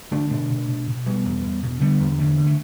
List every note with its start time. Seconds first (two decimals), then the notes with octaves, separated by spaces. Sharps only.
0.11 D3 A3 D4
0.31 B2 A3 D4
0.49 B2
0.68 B2
0.87 B2
1.06 B2 G3 B3
1.25 E2
1.44 E2
1.63 B2
1.81 D3 G3 B3
2.00 E2
2.19 D3 E3 A3
2.38 D3
2.47 A3